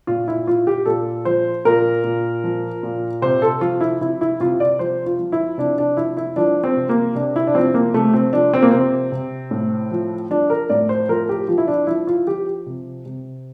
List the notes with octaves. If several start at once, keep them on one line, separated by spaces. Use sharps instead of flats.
A#2 F4
E4
A#2 F4
G4
A#2 A4
F3 C5
A#2 A#4
A#2
F3
A#2
C3 C5
A4
F3 F4
E4
C3 E4
E4
C3 F4
D5
F3 C5
F4
F3
E4
C3 D4
D4
F3 E4
E4
F3 D4
C4
C3
A#3
C3 D4
E4
D4
F3 C4
A#3
C3 A3
C4
F3 D4
C4
A#3
C3 C4
C3
A2
F3
F3 D4
A#4
A2 D5
C5
F3 A#4
G4
F3 F4
E4
D4
F3 E4
F4
F3 G4
C3
C3